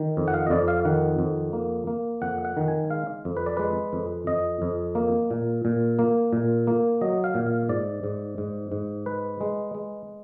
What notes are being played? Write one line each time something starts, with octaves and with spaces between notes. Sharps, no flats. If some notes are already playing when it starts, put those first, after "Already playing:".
Already playing: D#3
F2
F#5
F5
D#5
F2 D5
F5
D#3 F#5
F2
A#3
A#3
F2 F#5
F#5
D#3
G#5
G#3 F5
F2
B4
D5
G#3 B4
F2
F2 D#5
F2
A#3
A#2
A#2
A#3
A#2
A#3
F#3 D#5
F5
A#2
F5
G#2 D5
G#2
G#2
G#2
G#3 B4
G#3
G#3